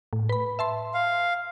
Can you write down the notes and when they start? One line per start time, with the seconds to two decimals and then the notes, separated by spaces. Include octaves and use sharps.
0.13 A2
0.29 B4 B5
0.59 E5 A5 C6
0.94 F5